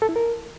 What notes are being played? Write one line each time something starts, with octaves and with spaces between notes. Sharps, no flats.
A4
E4
A#4